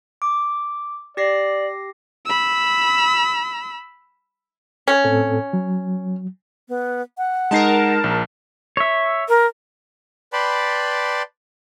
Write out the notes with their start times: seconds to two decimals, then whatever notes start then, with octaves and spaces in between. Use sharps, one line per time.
0.22 D6
1.17 G4 D5 A#6 C7
2.26 B5 E6
4.88 C#4
5.04 A2 C4 A4
5.53 F#3
6.69 B3
7.18 F#5
7.51 G#3 D#4 A#4 A5 C7
8.04 A#1
8.77 C#5 E5
9.29 A#4
10.33 B4 D5 G5 A5 B5 C6